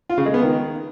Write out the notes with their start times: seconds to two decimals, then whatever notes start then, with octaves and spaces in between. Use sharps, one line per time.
0.10 F4
0.18 C#3
0.26 G#3
0.34 B3
0.42 D#3